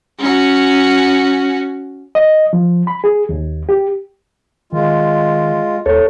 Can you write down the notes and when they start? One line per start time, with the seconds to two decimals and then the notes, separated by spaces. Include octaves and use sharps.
0.19 C#4 F#4
2.15 D#5
2.53 F3
2.87 B5
3.04 G#4
3.29 D#2
3.69 G4
4.73 D#3 G#3 F4
5.86 D#2 A4 C#5